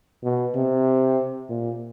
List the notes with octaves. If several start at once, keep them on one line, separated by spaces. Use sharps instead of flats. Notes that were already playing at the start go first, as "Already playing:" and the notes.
B2
C3
A#2